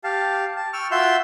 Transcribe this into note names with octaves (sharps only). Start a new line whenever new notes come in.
G4 F5 A5
A5
G5 C#6 E6 F6
F4 F#4 E5 C6 E6 G6